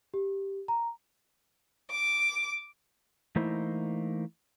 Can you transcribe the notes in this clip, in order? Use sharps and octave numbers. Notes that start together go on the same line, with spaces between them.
G4
A#5
D6
E3 A3 A#3 D#4 E4 C5